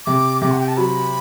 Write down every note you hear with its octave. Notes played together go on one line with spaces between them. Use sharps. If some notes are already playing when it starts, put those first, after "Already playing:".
C3 D6
C3 D6
F#5
G5
A5
F#3 B5